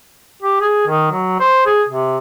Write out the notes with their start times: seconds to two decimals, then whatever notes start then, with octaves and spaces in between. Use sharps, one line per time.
0.42 G4
0.61 G#4
0.87 D#3
1.12 F#3
1.40 C5
1.66 G#4
1.88 C3